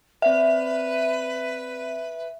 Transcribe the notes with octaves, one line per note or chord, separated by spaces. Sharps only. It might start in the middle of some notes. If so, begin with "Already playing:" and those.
C4 B4 D5 E5 F#5